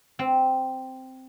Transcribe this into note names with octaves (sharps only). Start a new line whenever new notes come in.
C4